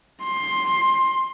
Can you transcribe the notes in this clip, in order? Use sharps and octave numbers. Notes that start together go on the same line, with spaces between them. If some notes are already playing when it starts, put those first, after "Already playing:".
C6